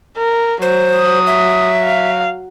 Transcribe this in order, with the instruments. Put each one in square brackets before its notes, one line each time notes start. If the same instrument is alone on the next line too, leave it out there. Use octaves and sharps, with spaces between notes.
[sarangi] A#4
[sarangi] F#3 [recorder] C5
[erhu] D#6
[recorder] E5
[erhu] F5